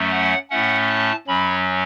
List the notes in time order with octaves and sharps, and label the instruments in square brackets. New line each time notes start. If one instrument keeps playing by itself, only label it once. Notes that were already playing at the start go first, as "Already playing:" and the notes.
Already playing: [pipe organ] F#2 F#3 A3 C#4
F#5
A2 A3 C#4 F#5
A5
F#2 F#3 C#4 B5